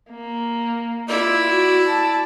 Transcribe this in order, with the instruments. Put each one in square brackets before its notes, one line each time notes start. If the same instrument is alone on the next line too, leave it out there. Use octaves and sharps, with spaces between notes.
[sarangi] A#3
[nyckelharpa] E4 D5 [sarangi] F4
[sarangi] F#4
A5